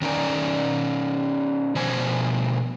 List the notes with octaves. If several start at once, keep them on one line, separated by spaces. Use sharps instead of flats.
D#3 C#4 D#4 A#4 D5 G#5
B2 F3 C5 G#5